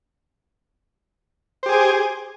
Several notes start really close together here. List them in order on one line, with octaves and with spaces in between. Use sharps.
C5 G4 G#4 G#5